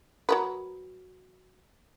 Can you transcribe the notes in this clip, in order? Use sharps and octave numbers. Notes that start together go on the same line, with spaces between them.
F#3 A#4 B4